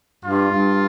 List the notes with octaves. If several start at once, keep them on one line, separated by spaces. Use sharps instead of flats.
G2 F4
G2